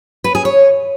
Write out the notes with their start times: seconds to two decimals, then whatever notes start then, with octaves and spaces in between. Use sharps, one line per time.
0.24 B4
0.35 G#4
0.45 C#5